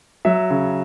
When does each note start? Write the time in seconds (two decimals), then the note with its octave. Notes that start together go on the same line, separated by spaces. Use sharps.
0.25 F#3 E5
0.50 C#3